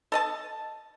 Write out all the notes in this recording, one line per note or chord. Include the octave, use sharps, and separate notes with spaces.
A4 D#5 A5